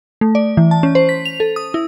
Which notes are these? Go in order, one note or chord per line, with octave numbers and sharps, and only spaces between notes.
A3
D5
E3
A5
C#4
C5
B6
F7
A4
D#6
E4